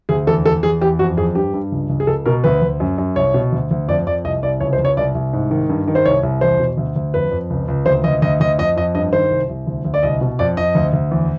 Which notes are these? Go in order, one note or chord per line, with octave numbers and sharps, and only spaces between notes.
D2 G#4
E2 A4
E2 A4
E2 G#4
E2 G4
F2 F#4
F2 G#4
G2 G4
G2
C#2
C#2
G#4
C#2 A4
B2 A#4
D2 B4
D2
F#2
F#2
C2 C#5
B2
D2
D2
F2 D5
F2 D5
C2 D#5
C2 D5
C#2 C#5
C5
C#2
C#5
C2 D5
C2
G#2
D#3
G2
D#3
C5
C2 C#5
C2
E2 C5
B2
D2
D2
F2 B4
F2
C#2
C#2
D2 C5
D2 D#5
D2 D#5
D2 D#5
F2 D#5
F2 D#5
G2 D#5
D#3 C5
C2
C2
D2
D2
D5
C2 D#5
B2
F2 D5
F2 D#5
D2
D2
E2